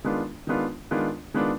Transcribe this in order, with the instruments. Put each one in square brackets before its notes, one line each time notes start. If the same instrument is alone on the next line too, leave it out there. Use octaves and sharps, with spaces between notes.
[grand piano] D#3 G#3 B3 D4 F4
D#3 G#3 B3 D4 F4
D#3 G#3 B3 D4 F4
D#3 G#3 B3 D4 F4